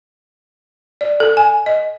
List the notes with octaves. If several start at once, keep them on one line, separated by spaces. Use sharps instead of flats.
D5
A4
G#5
D#5